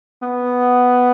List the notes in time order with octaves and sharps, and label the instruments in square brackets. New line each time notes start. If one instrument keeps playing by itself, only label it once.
[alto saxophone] B3